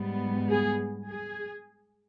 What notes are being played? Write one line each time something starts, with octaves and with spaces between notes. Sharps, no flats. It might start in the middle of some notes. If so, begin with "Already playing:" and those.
Already playing: G#2 G3 B3
G#4
G#4